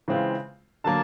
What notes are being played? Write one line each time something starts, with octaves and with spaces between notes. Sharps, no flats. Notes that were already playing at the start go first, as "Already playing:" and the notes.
C#3 E3 G#3 C4 F4
D3 F#3 A#3 A5